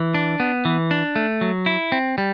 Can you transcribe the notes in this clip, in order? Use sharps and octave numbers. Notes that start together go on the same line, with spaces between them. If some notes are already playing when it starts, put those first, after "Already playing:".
Already playing: E3
D4
B3
E3
D4
A3
F#3
E4
C4
G3